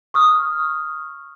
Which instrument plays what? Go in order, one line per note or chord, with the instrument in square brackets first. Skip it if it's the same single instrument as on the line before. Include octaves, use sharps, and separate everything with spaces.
[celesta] C#6 D#6 F6